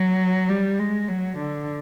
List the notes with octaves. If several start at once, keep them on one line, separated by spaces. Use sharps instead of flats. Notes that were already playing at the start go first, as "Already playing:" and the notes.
Already playing: F#3
G3
G#3
F#3
D3